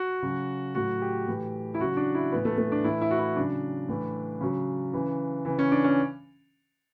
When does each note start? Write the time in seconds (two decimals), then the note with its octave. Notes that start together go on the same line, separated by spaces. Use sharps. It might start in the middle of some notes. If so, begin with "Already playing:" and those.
Already playing: F#4
0.23 C#3 F#3
0.75 A2 F#3 F#4
1.02 G4
1.28 A2 E3
1.74 E4
1.80 C#3 F#3 F#4
1.97 D4
2.15 E4
2.32 A2 E3 B3
2.45 A3
2.58 A3
2.72 D4
2.84 A2 E3 E4
3.01 E4
3.11 F#4
3.19 E4
3.36 C#3 F#3 D4
3.89 A2 E3
4.41 C#3 F#3
4.93 C#3 E3
5.45 C#3 E3
5.59 C#4
5.72 D4
5.84 C#4